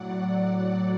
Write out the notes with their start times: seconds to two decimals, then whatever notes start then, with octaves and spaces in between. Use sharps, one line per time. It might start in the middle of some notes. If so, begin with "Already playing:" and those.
Already playing: A2 F#3 D5 F#5